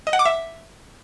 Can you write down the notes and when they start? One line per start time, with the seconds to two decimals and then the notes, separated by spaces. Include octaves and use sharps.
0.07 D#5
0.13 F#5
0.19 D6
0.25 E5